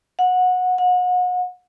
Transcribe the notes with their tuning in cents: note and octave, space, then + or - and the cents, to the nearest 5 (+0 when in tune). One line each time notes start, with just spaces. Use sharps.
F#5 -20
F#5 -35